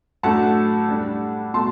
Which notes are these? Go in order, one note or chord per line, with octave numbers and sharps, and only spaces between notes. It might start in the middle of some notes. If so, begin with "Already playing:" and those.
A2 F#3 A3 D4 F#5 A5
A2 G3 D4
B2 A3 A5 C6